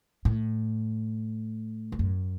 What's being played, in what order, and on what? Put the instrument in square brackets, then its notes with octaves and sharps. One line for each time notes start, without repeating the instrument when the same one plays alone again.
[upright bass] A2
G2
F#2